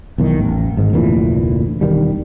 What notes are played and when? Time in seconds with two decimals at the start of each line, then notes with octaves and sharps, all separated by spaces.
0.18 B1 E2 D#3
0.39 A1
0.77 G#1 G#2
0.93 F1 D2 A#2 E3
1.81 E1 D#3 G3